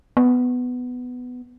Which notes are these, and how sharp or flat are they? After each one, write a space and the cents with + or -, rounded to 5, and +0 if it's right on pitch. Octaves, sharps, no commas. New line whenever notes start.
B3 +10